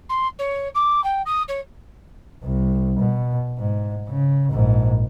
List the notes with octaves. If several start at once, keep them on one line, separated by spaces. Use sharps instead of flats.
C6
C#5
D6
G5
D#6
C#5
C2
B2
G#2
C#3
A#1 G#2